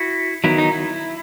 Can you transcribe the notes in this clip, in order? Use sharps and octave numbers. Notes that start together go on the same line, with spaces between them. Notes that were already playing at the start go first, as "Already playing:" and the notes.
Already playing: E4 F#4
D#3 F#3 B3 E4
D#4
E4